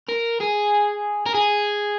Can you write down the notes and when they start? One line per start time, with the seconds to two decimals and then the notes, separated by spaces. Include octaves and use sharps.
0.08 A#4
0.40 G#4
1.26 A#4
1.35 G#4